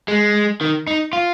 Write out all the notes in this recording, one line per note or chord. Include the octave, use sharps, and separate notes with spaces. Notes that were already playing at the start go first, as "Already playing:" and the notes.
G#3
D#3
D#4
F4